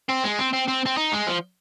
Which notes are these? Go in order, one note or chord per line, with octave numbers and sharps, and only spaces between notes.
C4
G#3
C4
C4
C4
C4
D#4
G#3
F3